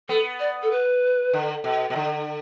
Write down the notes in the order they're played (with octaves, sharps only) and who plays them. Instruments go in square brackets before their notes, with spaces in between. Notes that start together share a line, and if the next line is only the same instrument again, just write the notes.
[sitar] B3 [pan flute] A4
[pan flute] D5
A4
B4
[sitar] D3
B2
B2
D3